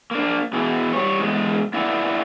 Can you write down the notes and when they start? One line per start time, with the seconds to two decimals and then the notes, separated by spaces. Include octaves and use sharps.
0.11 A#3 D4
0.53 B2 E3 G#4
0.93 G3 C#5
1.19 E2 G#2 G#3
1.74 A#3 E4 D5 E5 F#5 G#5